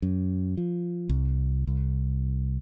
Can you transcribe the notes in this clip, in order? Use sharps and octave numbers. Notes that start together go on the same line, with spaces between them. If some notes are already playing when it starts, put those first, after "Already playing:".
F#2
F3
C2
C2